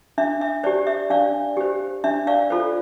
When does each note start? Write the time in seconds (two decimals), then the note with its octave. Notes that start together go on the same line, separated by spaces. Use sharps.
0.18 D4 E5
0.41 E5
0.64 G4 C5 D5
0.87 E5
1.10 D4 D5 F5
1.57 G4 C5
2.04 D4 E5
2.27 D5 F5
2.50 F4 A4 C5